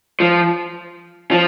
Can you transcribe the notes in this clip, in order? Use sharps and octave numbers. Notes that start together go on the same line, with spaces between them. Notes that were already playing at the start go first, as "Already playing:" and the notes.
F3
F3